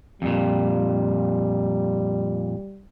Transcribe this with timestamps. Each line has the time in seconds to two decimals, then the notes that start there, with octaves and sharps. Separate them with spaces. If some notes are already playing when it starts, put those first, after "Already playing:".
0.22 F2 A#2 G3